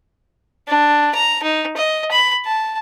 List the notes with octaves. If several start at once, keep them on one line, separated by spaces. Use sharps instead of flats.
D4
A#5
D#4
D#5
B5
A5